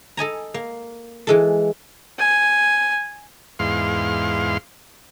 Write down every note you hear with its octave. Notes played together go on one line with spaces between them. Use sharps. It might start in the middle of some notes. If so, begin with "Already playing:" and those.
A4 D#5 G#5 A#5
A#3
E3 G#3 A4
G#5
E2 G#2 F5 C6